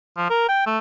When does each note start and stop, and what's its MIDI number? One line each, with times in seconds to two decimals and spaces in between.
0.17 0.29 53
0.30 0.47 70
0.48 0.61 79
0.66 0.79 57